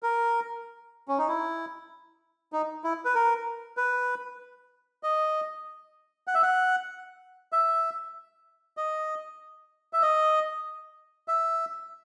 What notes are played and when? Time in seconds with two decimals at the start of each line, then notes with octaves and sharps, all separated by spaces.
0.03 A#4
1.08 C#4
1.18 D#4
1.28 E4
2.53 D#4
2.84 E4
3.05 B4
3.15 A#4
3.77 B4
5.03 D#5
6.27 F#5
6.35 E5
6.43 F#5
7.52 E5
8.77 D#5
9.93 E5
10.02 D#5
11.28 E5